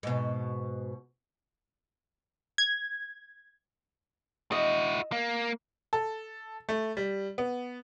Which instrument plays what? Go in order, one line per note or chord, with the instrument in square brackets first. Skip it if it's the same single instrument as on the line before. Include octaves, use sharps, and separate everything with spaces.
[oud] G#2 B2
[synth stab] G#6
[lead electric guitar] E4 F#4 [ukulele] D#5
[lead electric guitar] A#3
[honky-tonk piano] A4
A3
G3
B3